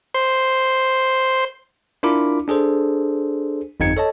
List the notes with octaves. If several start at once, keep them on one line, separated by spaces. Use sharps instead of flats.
C5
D4 E4 F4 A#4 B5 D6
D4 G#4 A4 C5
G1 F2 D#4 G#6 C#7
A4 C#5 D#5 A5